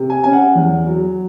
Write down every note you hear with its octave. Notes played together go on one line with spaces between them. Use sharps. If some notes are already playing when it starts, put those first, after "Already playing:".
Already playing: C3
G#5
C#4 G#5
F#5
E2
F#3